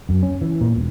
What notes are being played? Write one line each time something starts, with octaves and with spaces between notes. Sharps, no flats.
F#2
C#4
E3
A#2
E1